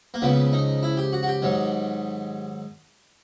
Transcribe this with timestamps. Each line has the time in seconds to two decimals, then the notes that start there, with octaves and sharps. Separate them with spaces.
0.14 A#3
0.22 C#2 C#3 F3 B3
0.53 D#4
0.83 E4
0.97 G4
1.13 F#4
1.23 F#4
1.27 G4
1.42 G#2 D#3 F#3